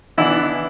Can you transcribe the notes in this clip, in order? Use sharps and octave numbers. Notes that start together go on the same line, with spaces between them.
E3 B3 D4 E4